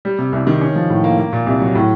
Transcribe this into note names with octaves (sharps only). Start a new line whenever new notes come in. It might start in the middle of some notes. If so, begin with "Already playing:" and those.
G3
C3
C2
D#3
C#4
F3
A2
A#3
A#3
A#2
C2
F#3
A2